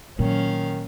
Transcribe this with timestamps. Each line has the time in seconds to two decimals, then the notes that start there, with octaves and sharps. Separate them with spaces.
0.19 A#2 D#3 F#3 C#4 F5